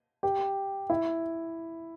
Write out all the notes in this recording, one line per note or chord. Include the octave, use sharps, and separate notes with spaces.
G4
E4